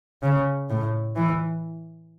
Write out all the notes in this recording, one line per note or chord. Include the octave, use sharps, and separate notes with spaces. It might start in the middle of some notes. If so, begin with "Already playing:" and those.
C#3
A2
E3